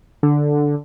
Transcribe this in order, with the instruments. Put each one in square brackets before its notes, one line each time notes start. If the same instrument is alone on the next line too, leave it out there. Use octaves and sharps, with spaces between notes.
[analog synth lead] D3